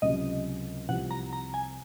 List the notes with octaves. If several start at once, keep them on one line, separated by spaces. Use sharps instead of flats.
C#2 C3 F#3 D#5
C2 C3 F3 F#5
A#5
A#5
G#5